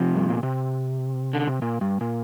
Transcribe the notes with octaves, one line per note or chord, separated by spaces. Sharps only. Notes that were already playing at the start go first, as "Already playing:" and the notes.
Already playing: C3 F3
G2
A#2
C3
D3
C3
A#2
G2
A#2